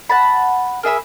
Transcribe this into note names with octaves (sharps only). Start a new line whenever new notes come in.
F#5 A5 B5
A#3 G#4 E5 B5